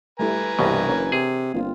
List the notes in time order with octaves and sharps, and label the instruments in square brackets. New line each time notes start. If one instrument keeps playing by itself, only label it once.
[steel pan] G3 A3 E4 [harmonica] B4 G#5 A#5
[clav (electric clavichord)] C2 B2 [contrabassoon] G2 [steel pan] E3 A#3 D4
[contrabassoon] F#1 [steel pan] A#4 C#5
[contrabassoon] C3 [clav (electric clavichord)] G#4
[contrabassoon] G1 [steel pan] A#3 C4 F4